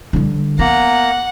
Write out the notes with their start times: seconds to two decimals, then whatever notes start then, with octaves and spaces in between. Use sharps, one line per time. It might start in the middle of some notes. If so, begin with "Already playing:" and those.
0.13 D3 G3
0.59 A#3 B3 F#5 A#5